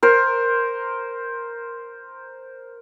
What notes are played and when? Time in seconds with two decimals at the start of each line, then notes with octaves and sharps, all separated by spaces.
0.03 A#4 C5